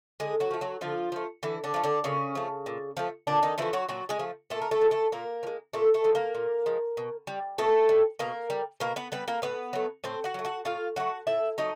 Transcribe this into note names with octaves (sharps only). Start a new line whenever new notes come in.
D3 G#3 G#4
F#3 F#4
F3 A3
F#3 F#4
D3 F3 F4
F3 A3
D3 E3 E4
D3 D4
F3 A3
D3 D4
A#2 C#3 C#4
F3 A3
A#2
F3 A3
A#2 D3 D4
D#3 D#4
E3 F3 A3 E4
F#3 F#4
A#2 F#3 F#4
G#3 G#4
F3 A3
A#2 A3 A4
A#4
A3 A4
F3 G#3
A3 A4
A#2 A#3 A#4
F3
G#3
A#2 A3 A4
A3 A4
F3 G#3
A#3 A#4
A#2
F3 G#3
B2
G3
B2 A3 A4
G3
B2 A#3 A#4
G3
B2 A#3 A#4
B3 B4
G3 B3 B4
A#3 A#4
A2 B3 B4
F#3 A3
A2 C4 C5
F#4 F#5
F#3 A3
F#4 F#5
A2 F4 F5
F#3 A3 F#4 F#5
A2 E4 E5
F#3 A3 D#4 D#5